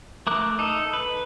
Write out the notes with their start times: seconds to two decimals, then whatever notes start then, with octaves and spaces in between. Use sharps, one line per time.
0.27 A3 A#4 D6 F#6
0.59 D#4 A4
0.93 B4